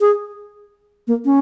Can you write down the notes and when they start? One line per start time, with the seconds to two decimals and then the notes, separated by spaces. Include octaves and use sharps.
0.01 G#4
1.07 A#3
1.25 C#4